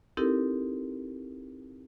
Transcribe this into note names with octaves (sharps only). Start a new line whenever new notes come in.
C4 D#4 E4 G4 A4 A#4